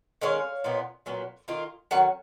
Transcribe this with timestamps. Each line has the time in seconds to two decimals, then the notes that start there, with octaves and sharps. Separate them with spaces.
0.21 D#3 G#3 C#4 C#5 F5
0.64 A#2 F3 B3 D#4
1.06 A#2 F#3 B3
1.48 D#3 A#3 F4
1.91 D#3 F#3 C#4 F#5